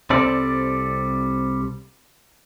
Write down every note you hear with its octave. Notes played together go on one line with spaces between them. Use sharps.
C2 G3 C4 A4 D5